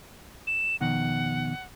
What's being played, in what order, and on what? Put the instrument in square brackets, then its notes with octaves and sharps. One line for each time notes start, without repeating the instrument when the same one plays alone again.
[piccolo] E7
[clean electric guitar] F2 B2 D#3 [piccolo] F#5